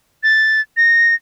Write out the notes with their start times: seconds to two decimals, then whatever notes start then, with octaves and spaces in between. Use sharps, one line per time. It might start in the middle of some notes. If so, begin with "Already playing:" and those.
0.23 A6
0.77 A#6